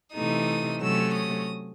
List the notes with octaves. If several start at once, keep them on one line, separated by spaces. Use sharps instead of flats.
C3 E3 A3 D#4 D#6
C3 F#3 A3 C#4 E6
D#6